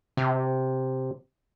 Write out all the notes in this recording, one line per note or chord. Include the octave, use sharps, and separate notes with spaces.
C3